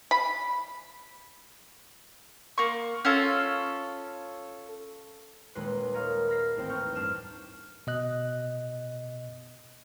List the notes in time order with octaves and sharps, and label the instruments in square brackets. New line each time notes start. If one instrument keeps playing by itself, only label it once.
[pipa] B5
[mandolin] A#3 C#6
C#4 F4 A4
[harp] D#1 D#2 G#3 B4 C6 F#6
G#4 A#4 C#5 D#5 F5
B5 F6 A#6 C7
A1 D#2 C4 C5 G5
C#6 F6 G6
G2 G3 D4 C5 F6 E7
[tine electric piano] B2 D#5 F#6